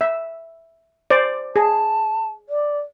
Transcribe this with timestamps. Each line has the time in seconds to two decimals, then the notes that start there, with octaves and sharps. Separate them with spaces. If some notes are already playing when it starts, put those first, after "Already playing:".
0.01 E5
1.10 C5 D5
1.56 G#4 A5
2.49 D5